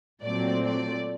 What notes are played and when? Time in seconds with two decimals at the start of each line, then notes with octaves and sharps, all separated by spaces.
0.23 A#2 F#3 A3 C4 D5
0.65 D5